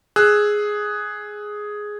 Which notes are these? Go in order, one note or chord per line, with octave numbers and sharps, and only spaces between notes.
G#4 E6 F#6